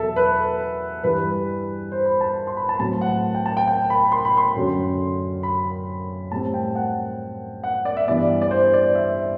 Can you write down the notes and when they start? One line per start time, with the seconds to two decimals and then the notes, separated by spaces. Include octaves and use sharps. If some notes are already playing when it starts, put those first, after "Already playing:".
Already playing: E2 B2 F#3 A4 E5
0.16 B4
1.03 G2 E3 G3 B4
1.92 C5
2.06 B5
2.21 A5
2.47 C6
2.57 B5
2.69 A5
2.80 A2 F#3 C4 A5
3.01 F#5
3.35 G5
3.46 A5
3.57 G5
3.68 G5
3.90 B5
4.12 C6
4.25 B5
4.37 C6
4.56 F#2 D3 F#3
5.43 B5
6.32 A2 G3 C4 A5
6.54 G5
6.75 F#5
7.64 F#5
7.85 D5
7.97 E5
8.08 G2 E3 B3 D5
8.42 D5
8.51 C5
8.74 D5
8.95 E5